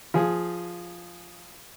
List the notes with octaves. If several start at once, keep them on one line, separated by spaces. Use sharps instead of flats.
F3 G#4